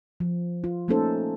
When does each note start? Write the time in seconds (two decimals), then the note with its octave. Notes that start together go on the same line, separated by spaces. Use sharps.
0.20 F3
0.64 F4
0.88 A3 A#3 C#4 D#4 A4 C5